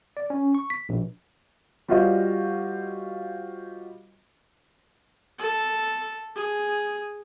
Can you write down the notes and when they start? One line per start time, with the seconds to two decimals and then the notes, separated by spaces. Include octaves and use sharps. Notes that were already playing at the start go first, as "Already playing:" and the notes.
0.17 D5
0.30 C#4
0.55 C#6
0.70 B6
0.89 A#1
1.88 G3 F4 F#4 C5 D#5 F5
5.38 A4
6.35 G#4